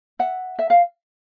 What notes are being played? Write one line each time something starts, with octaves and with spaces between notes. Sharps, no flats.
E5 F#5
E5
F5